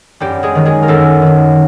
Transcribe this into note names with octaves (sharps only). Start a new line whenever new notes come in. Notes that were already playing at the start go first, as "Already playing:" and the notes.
F#2 G3 G4
G#3 G#4
D#3 F#3
G#3 G#4
A#4
F#2 A3 A4
D#3 F#3